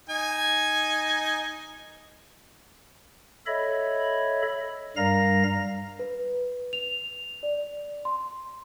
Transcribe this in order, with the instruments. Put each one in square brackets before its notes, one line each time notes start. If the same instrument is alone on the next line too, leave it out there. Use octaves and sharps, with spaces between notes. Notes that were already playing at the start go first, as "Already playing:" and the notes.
[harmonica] D#4 G#5
[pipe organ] A4 C#5 D#5 E5 B5
G2 G3 A#4 F5 A#5 A#6
[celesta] B4
F7
D5
C6